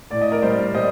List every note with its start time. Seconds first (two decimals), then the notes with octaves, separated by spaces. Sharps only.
0.11 A2 D5
0.21 D#5
0.31 A#4 D5
0.42 G3 C5 D#5
0.74 G3 C5 D#5